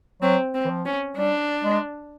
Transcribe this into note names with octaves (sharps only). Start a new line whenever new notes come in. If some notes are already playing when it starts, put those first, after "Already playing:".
F#3 C4
C4
E3
F3
C#4
G3 D4
G#3